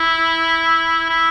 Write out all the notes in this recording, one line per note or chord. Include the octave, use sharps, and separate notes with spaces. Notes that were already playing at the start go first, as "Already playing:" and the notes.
Already playing: E4
E4